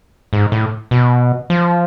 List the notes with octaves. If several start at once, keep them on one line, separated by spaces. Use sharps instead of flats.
G#2
A2
B2
F3